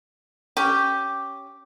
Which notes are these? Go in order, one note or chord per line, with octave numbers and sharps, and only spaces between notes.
C#4 G4